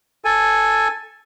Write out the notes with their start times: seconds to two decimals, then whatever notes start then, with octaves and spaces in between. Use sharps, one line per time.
0.25 A4 G#5